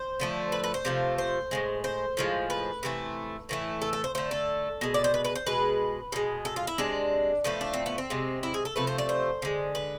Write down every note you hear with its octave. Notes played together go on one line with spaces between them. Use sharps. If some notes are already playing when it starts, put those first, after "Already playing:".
Already playing: C5
D3 F3 A3
B4
B4
C5
C3 F3 A3
C5
A2 F3 G#3
C5
A2 F3 G#3
B4
C3 E3 A3
A2 E3 A3
A4
A4
C5
D3 A3 C5
A4
B2 G#3
D5
C5
B4
B4
C5
B2 G#3 B4
B2 G#3
A4
F4
E4
C3 G#3 D4
A2 F3 A3 B3
D4
C4
B3
C4
C3 G#3
E4
G#4
A4
C3 F3 A3 B4
C5
D5
C5
D3 G#3
B4